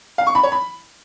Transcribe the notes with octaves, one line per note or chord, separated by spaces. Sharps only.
F5
C#6
B5
C#5
B5